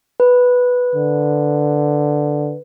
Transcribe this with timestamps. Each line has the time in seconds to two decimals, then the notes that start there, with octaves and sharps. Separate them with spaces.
0.20 B4
0.95 D3